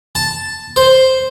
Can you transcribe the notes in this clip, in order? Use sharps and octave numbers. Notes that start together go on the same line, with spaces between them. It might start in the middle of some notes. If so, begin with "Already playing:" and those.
A5
C5